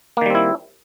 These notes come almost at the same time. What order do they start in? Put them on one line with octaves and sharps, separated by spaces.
A#3 D#3 G3 C4 E4